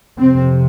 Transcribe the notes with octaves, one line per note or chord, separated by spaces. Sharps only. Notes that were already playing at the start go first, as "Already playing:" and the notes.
F2 C3 C4